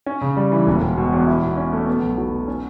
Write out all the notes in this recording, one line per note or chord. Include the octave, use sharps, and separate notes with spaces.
C#4
C#3
G3
E3
E1
E1
B2
E2
E4
B2
C#4
A3
B3
B1
F#3
B2
C#4